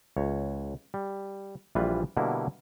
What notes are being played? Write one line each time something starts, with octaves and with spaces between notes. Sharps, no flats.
C#2 C#5
G3
A#1 E3 G3 F4 B4
B2 D3 G3 A#3 E4